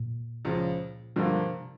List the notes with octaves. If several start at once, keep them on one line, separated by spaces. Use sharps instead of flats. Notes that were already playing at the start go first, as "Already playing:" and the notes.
Already playing: A#2
C#2 C#3 F3
G2 B2 D3 F3 A#3
C3